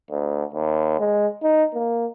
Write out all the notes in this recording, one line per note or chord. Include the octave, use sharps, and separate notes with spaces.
D2
D#2
G#3
D#4
A#3